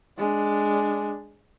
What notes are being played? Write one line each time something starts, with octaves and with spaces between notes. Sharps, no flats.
G#3 D4